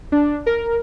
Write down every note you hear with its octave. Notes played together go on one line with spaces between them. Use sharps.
D4
A#4